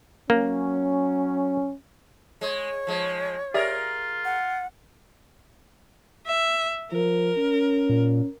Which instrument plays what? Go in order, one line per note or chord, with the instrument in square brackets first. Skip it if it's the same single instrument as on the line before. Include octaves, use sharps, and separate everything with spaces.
[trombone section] F#3 C#4 [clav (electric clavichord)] A#3
[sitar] G#3 [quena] C#5
[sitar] F3 G#3
[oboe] F4 [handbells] G4 D5 E5 [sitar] G#4 A#4
[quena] F#5
[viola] E5
[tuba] F3 [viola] A#4
[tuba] C#4
[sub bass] A#2